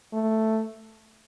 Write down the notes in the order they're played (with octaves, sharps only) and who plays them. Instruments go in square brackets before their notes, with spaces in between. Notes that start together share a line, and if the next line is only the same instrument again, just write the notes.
[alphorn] A3